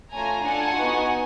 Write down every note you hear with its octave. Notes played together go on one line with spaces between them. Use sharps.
A3 C#4 F4 G#5 A#5
D4 F4 A4 F#5 G#5
B3 D#4 F#4